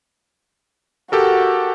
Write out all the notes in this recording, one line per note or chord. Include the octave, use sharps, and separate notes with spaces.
F#4 G4 A4 A#4